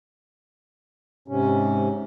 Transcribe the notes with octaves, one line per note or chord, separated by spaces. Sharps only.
G#2 C3 C#4